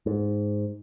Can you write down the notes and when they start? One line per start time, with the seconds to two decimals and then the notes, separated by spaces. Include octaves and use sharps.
0.06 G#2